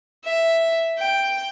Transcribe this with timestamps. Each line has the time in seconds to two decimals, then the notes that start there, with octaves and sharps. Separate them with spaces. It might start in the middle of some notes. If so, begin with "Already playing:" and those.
0.24 E5
0.98 G5